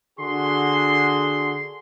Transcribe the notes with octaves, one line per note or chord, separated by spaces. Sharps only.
D3 F#4 G#4 C6